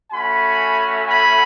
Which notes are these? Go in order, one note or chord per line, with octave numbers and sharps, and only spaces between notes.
A3 C#4 F#4 G#5 B5
G#5 B5